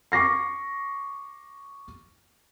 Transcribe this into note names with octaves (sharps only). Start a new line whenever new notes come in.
C#6 D6 A#6 C7